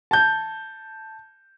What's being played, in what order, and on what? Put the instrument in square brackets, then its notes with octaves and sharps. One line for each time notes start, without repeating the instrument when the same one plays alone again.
[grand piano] A5 G6